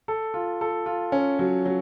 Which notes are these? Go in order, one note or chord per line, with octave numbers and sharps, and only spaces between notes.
A4
F4
A4
F4
C#4
F#3
F#3